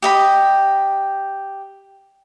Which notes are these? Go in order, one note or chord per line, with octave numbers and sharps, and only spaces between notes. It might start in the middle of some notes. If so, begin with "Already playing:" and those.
G4 D#5 B5